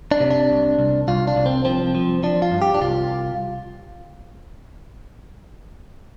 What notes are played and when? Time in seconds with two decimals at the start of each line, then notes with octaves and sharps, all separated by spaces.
0.11 D4
0.20 C3
0.31 D4
0.50 C2
0.79 C2
1.08 C2 F4
1.27 D4
1.36 C2
1.46 C4
1.65 F3 C4
1.95 F3
2.23 F3 D4
2.42 F4
2.52 G2
2.62 G4
2.74 D4
2.81 C2 F4